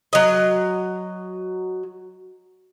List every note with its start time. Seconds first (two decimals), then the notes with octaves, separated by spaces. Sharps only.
0.13 F#3 D#5